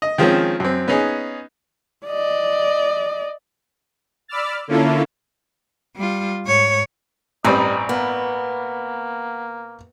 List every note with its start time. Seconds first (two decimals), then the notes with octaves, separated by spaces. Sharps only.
0.02 D#5
0.18 D#3 F3 G#3 C4 C#4
0.60 F#2 C4
0.88 B3 C#4 D#4 G#4
2.07 D5 D#5
4.28 D5 B5 D6 E6 F6 A6
4.68 D3 A#3 C#4 E4 F4 A4
5.97 G3 F4
6.45 G#2 C#5
7.45 A1 G2 G3 C4 D5 D#5 A#5 B5
7.89 A#3 B3